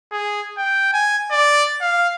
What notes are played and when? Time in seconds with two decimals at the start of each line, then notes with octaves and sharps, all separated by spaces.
0.12 G#4
0.57 G5
0.94 G#5
1.31 D5
1.81 F5